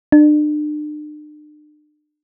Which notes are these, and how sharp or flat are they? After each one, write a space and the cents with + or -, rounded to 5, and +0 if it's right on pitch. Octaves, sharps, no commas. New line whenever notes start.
D4 +40